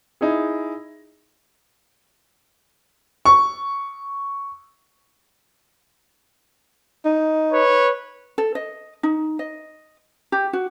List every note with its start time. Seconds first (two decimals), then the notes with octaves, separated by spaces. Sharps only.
0.21 D#4 E4 G#4
3.25 C#6
7.05 D#4
7.52 B4 C#5
8.38 A4
8.55 D#5
9.03 D#4
9.39 D#5
10.32 G4
10.53 F#4